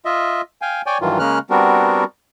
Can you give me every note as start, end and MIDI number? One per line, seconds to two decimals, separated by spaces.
0.05 0.41 65
0.05 0.41 75
0.05 0.41 76
0.62 0.82 77
0.62 0.82 79
0.62 0.82 80
0.86 0.98 73
0.86 0.98 74
0.86 0.98 79
0.86 0.98 80
1.01 1.18 43
1.01 1.18 51
1.01 1.18 52
1.01 1.18 54
1.01 1.18 65
1.19 1.39 49
1.19 1.39 56
1.19 1.39 58
1.19 1.39 61
1.19 1.39 89
1.19 1.39 90
1.50 2.04 55
1.50 2.04 59
1.50 2.04 60
1.50 2.04 62
1.50 2.04 66
1.50 2.04 70